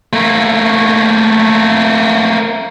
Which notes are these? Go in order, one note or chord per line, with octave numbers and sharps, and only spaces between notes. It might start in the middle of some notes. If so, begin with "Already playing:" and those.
A3 A#3